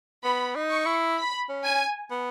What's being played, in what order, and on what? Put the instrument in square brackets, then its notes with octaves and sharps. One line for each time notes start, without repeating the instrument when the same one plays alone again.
[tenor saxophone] B3 [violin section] B5
[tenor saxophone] D#4
[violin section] C#6
[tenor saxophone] E4
[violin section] B5
[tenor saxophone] C#4
[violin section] G#5
[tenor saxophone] B3